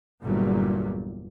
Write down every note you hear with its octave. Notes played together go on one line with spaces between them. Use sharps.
G1 E2 A#2 F#3 G3